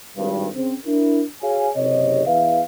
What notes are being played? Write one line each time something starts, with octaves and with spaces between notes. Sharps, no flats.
G#1 G2
C#3 C4
D4 E4 A#4
F#4 G#4 C#5 F5 G#5
F#1 C3 C#5 D#5
E2 E3 E4 B4 E5 F5